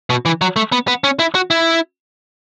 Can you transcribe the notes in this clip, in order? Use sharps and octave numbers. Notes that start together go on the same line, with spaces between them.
B2
E3
F#3
A3
B3
B3
C#4
E4
F#4
E4